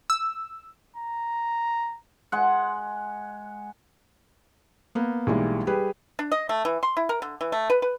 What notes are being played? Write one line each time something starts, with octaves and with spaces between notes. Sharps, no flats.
E6
A#5
G#3 F#5
A#3 B3
B1 E3 G3 G#3 A#3
G3 G4 G#4 B4
D4
D#5
A3
E3
C6
E4
A#4
D3
E3
A3
B4
B4